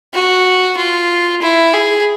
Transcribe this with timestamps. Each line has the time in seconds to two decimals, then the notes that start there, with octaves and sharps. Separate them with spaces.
0.14 F#4
0.77 F4
1.42 E4
1.73 G#4